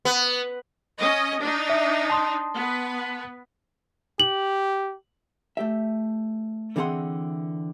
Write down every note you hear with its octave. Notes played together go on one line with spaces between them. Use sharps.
B3
C#4 D#5
D4 D#4
E5
A5 C6 D#6
B3 B4
G4 F#7
A3 G4 E5
D3 E3 C4 G#4 F#5 C6